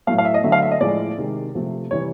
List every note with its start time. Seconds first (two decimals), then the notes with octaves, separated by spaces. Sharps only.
0.07 A2 F#3 A3 F5
0.18 F5
0.25 E5
0.34 D#5
0.44 D3 F#3 A3 E5
0.52 F5
0.62 E5
0.71 D#5
0.81 A2 F3 G#3 D5
1.18 C3 D#3 G#3
1.55 C3 F3 A3
1.91 C3 E3 G3 C#5